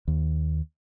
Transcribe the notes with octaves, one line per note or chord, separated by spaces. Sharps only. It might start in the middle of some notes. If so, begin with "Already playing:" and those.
D#2